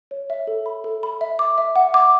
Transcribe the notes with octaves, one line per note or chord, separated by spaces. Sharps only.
C#5
E5
A4
B5
A4
B5
E5
D6
E5
F#5
D6